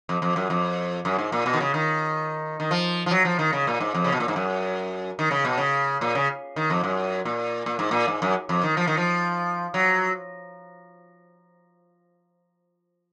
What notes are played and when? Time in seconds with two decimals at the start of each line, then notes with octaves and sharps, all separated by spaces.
0.09 F2
0.22 F2
0.36 F#2
0.50 F2
1.05 F#2
1.18 G#2
1.32 A#2
1.46 B2
1.53 D#3
1.60 C#3
1.74 D#3
2.60 D#3
2.71 F3
3.06 F3
3.11 F#3
3.25 F3
3.39 D#3
3.53 C#3
3.67 A#2
3.80 G#2
3.94 F2
4.04 C#3
4.12 B2
4.20 A#2
4.28 G#2
4.36 F#2
5.19 D#3
5.31 C#3
5.45 B2
5.58 C#3
6.01 A#2
6.15 C#3
6.56 D#3
6.70 F2
6.84 F#2
7.25 A#2
7.66 A#2
7.79 G#2
7.91 A#2
8.08 G#2
8.22 F#2
8.49 F2
8.63 D#3
8.77 F3
8.87 D#3
8.97 F3
9.74 F#3